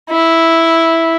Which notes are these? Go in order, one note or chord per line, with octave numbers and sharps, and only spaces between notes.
E4